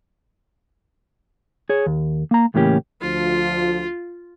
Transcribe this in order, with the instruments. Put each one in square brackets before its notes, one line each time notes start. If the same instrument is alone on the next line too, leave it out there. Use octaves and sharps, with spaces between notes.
[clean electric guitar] G#4 C#5
D#2
A#3 A#5
C#2 A2 E3 A#3 C#4 G4
[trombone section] D2 F3 [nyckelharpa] F4